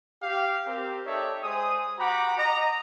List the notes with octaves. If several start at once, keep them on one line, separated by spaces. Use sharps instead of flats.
G4 F5
C4 G4 A#4
D#4 G4 A4 C#5 D5 E5
G#3 G#4 C5 D#6
F#4 G4 F#5 A#5 B5 D6
D#5 A#5